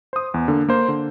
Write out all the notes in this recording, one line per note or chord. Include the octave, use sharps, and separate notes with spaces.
C5 D#6
E2
D3 A#3
A#3 C5
D3